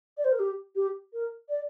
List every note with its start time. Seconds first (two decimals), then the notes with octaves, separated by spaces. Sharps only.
0.17 D5
0.24 C5
0.31 A#4
0.39 G4
0.75 G4
1.12 A#4
1.48 D5